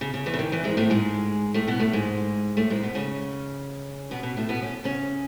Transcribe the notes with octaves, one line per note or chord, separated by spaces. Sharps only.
C#3
C#3
E2 E3
C#3
D#3
E2 E3
G#2 G#3
A2 A3
G#2 G#3
A2 A3
B2 B3
A2 A3
G#2 G#3
A2 A3
G#2 G#3
B2 B3
C#3 C#4
B2 B3
B2 B3
A2 A3
B2 B3
C#4
C#3 C#4